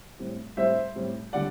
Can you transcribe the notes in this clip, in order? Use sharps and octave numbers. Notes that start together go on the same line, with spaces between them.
A2 G3 C4
A2 G3 C4 C5 E5
A2 G3 C4
D3 G3 D5 F#5